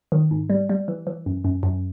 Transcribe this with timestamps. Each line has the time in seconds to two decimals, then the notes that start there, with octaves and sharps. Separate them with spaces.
0.12 D#3
0.31 G#2
0.50 G3
0.70 G3
0.88 E3
1.07 E3
1.26 F#2
1.44 F#2
1.63 F#2